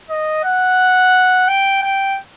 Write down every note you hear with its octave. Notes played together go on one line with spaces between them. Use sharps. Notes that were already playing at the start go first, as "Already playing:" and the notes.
D#5
F#5
G5
G5